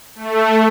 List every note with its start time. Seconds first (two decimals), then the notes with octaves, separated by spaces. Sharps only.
0.16 A3